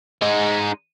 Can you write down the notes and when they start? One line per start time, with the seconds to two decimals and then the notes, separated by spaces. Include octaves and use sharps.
0.22 G#3 D#4